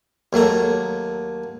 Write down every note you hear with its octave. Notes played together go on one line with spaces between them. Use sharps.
D#2 F#3 A3 A#5